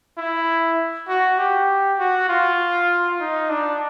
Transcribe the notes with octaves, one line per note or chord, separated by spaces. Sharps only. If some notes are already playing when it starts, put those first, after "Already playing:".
E4
F#4
G4
F#4
F4
D#4
D4